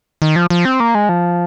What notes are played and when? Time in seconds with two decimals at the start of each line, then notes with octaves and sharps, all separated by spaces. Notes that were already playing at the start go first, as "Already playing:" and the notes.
0.22 D#3
0.36 F3
0.50 F3
0.65 C4
0.80 A#3
0.95 G#3
1.09 F3